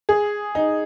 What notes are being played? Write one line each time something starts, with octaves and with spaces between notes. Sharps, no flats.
G#4
D#4